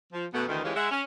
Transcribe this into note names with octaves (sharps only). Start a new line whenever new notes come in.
F3
F#2 B2 A3 B3
D2 D#3 E3
D2 E3 G#3 C#4 F4 G4
G#3 E5 F#5
C#4